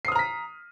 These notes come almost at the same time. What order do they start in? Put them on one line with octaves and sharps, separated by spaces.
C7 D#6 F6 A#5 B6